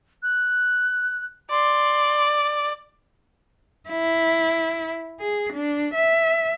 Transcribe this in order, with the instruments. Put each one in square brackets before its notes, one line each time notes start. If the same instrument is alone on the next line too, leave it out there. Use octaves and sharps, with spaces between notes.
[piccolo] F#6
[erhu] D5 [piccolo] C6
[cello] E4
G#4
D4
E5